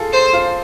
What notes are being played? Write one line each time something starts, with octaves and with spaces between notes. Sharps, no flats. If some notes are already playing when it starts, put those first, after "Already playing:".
Already playing: F4 G#4 A4
C5
F4